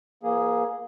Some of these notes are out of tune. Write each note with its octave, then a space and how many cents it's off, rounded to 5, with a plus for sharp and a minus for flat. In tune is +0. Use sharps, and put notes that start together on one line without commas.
F3 -40 A#3 +20 G#4 +0